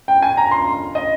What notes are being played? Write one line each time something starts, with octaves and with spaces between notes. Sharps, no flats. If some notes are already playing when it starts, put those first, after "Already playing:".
G5
G#5
A#5
C6
D#5